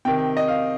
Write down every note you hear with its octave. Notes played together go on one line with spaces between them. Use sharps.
C3 D#3 G5
D#5
F5